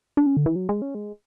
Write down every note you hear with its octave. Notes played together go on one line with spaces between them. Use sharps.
D4
C#4
D3
E3
F#3
G#3
C#4
G#3